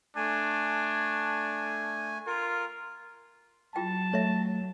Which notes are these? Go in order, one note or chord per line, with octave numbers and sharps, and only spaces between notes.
A3 D4 G#5
F4 A#4
F#3 F4 G#4 G5 A5
A3 C#5 E5